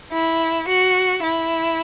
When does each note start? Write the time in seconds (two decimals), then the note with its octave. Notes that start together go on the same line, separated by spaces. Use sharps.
0.12 E4
0.68 F#4
1.23 E4